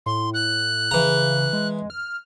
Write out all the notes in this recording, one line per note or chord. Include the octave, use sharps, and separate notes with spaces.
A2 C6
F#6
C#3 E3 A#5
G#3
F6